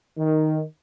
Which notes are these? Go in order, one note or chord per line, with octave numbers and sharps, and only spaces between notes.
D#3